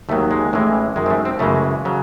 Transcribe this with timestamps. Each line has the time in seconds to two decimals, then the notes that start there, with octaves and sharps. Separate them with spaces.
0.09 D#2 D#3 F#3 A3
0.31 G#3
0.53 A1 A2 E3 G#3
0.96 F#2 D#3 G#3
1.06 C4
1.10 A3
1.25 C4
1.39 F#2 C#3 E3 G#3 A3
1.85 C#3 F#3